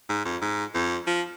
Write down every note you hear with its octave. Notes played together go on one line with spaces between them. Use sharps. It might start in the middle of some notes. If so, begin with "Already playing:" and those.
G#2
F2
G#2
F2
F3